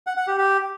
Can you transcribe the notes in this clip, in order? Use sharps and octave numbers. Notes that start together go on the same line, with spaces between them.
F#5
F#5
G4
G4